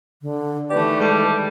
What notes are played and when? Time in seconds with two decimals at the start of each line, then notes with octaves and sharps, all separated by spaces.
0.22 D3
0.70 D#3 E3 A3 G4 B4 D5
1.01 G3 G#3 A4